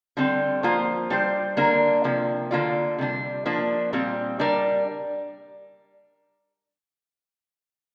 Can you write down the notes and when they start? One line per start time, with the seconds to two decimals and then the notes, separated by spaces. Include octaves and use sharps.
0.17 D3 G3 C4
0.63 F3 A#3 F4 C5
1.10 G3 D4 G4 C5
1.57 D3 A#3 D4 A#4
2.04 C3 F3 A#3
2.51 D3 A#3 F4 D5
2.98 C3 G3 D4
3.46 F3 A#3 D4
3.93 A#2 G3 C4
4.39 G3 D4 A#4 D5